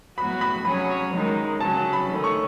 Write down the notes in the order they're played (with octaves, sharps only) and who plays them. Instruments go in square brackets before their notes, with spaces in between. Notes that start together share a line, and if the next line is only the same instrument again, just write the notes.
[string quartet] A2 F#3 B3 F#4 [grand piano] B5
[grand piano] B5
[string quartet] F#3 C#4 G#4 C#5 [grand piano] B5
[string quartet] F#2 D#3 G#3 D#4
[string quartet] C#3 F#3 C#4 [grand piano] A5
[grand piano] A5
B5
[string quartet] D#3 A3 C#4
[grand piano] C#6